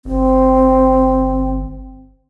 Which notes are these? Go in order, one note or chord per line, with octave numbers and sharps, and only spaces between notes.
G1 C4